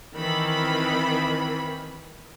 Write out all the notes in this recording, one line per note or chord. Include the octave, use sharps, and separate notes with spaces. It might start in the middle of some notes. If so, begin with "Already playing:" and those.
D#3 E3 C4 B5